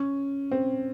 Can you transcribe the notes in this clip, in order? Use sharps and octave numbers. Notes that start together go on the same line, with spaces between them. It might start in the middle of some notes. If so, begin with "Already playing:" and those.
Already playing: C#4
C4